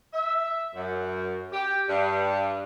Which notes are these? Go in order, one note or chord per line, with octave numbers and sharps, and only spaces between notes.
E5
F#2
G4
G2